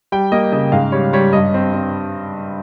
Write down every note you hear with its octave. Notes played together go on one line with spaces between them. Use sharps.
G3 G5
A#3 D#5
C#3 D#5
G#2 F5
G3 C#5
G3 C#5
G2 D#5
C4
C4